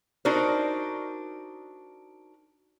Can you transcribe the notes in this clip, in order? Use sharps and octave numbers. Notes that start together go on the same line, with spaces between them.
D4 D#4 F#4 A#4 C5